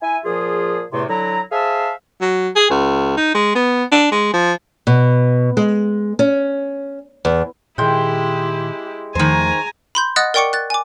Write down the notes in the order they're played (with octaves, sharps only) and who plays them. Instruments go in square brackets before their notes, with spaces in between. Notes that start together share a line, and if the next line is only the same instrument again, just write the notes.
[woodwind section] E4 E5 G#5
A#2 F3 F4 G#4
E2 A2 C3 A3 C6
D3 F#3 E4 A#5
G#4 C5 E5 F5 A5
[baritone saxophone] F#3
G#4
C#2
D#4
G#3
B3
D4
G#3
F3
[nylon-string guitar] B2
G#3
C#4
E2
[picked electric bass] A#2 D#3 [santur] G#3 G5 [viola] E4 G4
[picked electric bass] E2 F3 A3 [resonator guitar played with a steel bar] D#3 C5 [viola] G#5 A#5
[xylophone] B5 C6 G6
D#5 F#5 D#6 F#6 A6
A#4 D5 G5 C#6 D6 C#7
F#6 A6
G#5 D6